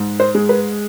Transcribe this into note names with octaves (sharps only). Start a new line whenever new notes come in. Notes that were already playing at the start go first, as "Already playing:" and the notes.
Already playing: G#2
C5
G#3
B4